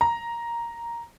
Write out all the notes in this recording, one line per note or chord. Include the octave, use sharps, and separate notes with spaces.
A#5